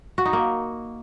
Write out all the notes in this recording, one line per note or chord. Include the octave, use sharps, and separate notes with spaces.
F#4
D#4
A#3